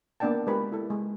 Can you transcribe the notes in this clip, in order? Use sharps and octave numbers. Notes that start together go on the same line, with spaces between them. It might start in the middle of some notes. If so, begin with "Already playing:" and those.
A#3 B3 D4 D5 G5 A5
G#3 F4 G4 A#4 B4 B5
E4 A4
G#3